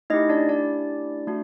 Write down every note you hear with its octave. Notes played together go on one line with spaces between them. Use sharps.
A3 C#4 D#4 E4 G4 D#5
D4 D5
D4 D5
A3 D4 F#4